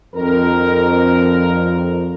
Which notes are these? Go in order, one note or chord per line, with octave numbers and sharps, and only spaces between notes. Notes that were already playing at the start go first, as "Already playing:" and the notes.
F2 D3 D#3 A#4